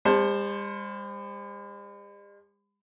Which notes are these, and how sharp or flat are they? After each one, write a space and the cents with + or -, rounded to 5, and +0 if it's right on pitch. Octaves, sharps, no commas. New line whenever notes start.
G3 +45 C5 +10 A5 +0